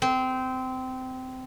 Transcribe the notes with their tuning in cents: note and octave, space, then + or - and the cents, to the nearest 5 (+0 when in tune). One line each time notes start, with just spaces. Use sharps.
C4 -20